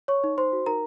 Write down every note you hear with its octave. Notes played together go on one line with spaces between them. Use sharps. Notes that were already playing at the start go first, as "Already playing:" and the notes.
C#5 C#6
D#4
D#4 C5 C6
F#4
D#4 A#4 A#5